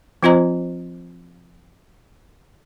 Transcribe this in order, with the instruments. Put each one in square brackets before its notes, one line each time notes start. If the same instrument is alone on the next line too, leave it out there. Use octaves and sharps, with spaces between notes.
[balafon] F3 C4 F4 C5 D#5 A#5